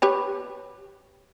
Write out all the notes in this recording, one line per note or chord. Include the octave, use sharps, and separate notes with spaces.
G4 B4 C#5